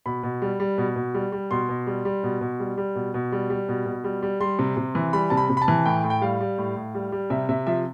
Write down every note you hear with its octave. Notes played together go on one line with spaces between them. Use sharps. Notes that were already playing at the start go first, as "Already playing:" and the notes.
B2 B5
B2
G3
G3
B2
B2
G3
G3
B2 C6
B2
G3
G3
B2
B2
G3
G3
B2
B2
G3
G3
B2
B2
G3
G3
G3 C6
C3
C3
E3
G3 B5
C3 A5
B5
C3
B5
A5
E3
A2 G5
A2
G5
G3 F5
G3
A2
A2
G3
G3
C3 E5
C3 E5
F3 E5